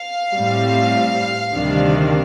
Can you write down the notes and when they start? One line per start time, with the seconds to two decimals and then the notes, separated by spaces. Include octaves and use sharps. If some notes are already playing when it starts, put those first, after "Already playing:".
Already playing: F5
0.35 A2 G3 C4
1.50 D2 C3 D#3 G3 D4